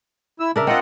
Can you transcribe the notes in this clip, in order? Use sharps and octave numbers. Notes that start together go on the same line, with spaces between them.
E4 E6
C#3 D4 A#4 E5
C4 F4 D#5 F#5